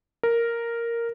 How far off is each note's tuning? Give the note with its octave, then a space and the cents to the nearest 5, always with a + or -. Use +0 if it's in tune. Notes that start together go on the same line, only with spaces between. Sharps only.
A#4 -5